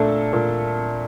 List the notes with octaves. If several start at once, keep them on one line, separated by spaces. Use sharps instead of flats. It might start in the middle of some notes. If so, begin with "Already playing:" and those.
Already playing: A#2 A3 D4 A4
A#2